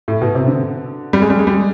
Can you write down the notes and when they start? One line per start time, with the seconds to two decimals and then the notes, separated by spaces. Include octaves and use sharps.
0.08 A2
0.21 B2
0.35 C3
0.47 D3
1.13 G3
1.22 G#3
1.30 G3
1.39 G#3
1.47 G3